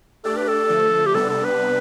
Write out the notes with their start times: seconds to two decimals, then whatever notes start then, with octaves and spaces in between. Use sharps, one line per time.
0.24 A3 D4 G4 A4 D5
0.37 B4
0.48 A4
0.69 D3 F3 A3
1.06 G4
1.14 C3 G3 B3 D4 A4
1.30 A4
1.44 B4